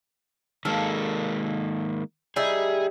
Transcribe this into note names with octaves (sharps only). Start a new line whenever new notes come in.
D#3 G#3 A#3 A4 F5
G3 D#4 E4 G#4